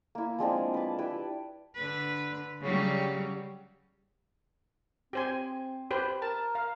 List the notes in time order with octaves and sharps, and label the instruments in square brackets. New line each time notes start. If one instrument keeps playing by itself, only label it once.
[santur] A#3 E4
F3 G#3 C4 D4
B4 A5
E4 G4 B4
[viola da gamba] D3 B4
C#3 F#3 G3
[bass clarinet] C4 [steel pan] G4 C5 G#5
[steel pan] G4 B4 C5
[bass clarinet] A#4 [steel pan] A5
[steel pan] F5